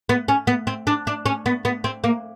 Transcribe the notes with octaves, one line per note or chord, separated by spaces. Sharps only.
B3
C#4
B3
C4
D4
D4
C#4
B3
B3
C4
A#3